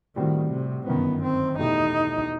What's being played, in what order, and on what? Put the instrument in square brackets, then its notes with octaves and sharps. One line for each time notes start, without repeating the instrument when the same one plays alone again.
[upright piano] A2 G3 C4 F#4 [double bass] D#3
[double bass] C3
[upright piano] G1 F#2 D#3 [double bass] B3
[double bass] C4
[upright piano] E2 B2 A3 E4 G4 [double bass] D#4